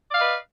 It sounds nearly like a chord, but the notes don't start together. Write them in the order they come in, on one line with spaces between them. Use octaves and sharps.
D5 F5 D#5 B4